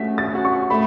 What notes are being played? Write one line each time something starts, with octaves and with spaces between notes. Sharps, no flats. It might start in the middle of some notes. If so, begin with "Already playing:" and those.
Already playing: A3 C#4 F#4 B6
A6
C#4 F#4
C#6
A3 B5